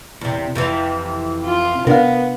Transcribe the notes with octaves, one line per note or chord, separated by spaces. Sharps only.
E2 C3
F2 C3 E3
F4
C3 B3 D4 A#4 F5